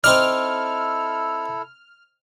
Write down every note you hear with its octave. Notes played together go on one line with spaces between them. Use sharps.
C4 D#4 E4 A4 D5 F6